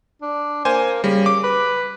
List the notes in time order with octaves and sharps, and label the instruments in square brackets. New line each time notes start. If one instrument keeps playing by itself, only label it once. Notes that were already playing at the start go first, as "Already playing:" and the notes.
[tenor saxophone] D4
[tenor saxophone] A#3 [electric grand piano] C5 G#5
[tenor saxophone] C#3 [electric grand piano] G3
[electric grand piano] D6
[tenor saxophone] B4